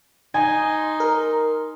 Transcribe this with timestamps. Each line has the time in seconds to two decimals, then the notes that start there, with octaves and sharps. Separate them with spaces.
0.34 D#4 G#5 C6
1.00 A#4